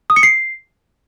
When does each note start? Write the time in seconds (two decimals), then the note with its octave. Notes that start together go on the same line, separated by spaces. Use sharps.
0.10 D#6
0.16 C#7
0.23 C7